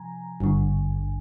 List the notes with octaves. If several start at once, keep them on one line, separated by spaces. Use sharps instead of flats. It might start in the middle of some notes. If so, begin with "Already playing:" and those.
Already playing: C3 F3 G#5 A#5
G#1 G2 D3